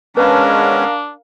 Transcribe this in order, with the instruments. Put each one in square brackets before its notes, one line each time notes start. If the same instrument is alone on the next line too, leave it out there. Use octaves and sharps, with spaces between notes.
[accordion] G#3 B3 C#4 [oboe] D4 [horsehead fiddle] A#4 F5 [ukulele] B4 A5